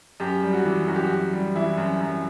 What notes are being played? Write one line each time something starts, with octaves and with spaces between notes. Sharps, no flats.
F#2 G4
G3
F#4
E3
F#2 F#4
G4
F#4
F#2
G3
E3 E4
F#2
F#2